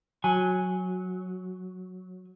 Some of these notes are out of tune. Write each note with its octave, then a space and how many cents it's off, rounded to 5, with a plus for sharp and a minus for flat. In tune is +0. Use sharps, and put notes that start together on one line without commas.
F#3 -10 G#5 +0